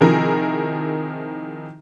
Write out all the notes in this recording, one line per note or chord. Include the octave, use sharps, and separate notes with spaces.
C3 D#3 F3 E4 G#4 A#4